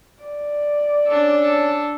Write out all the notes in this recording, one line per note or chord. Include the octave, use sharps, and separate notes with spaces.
D5
C#4 D4 A4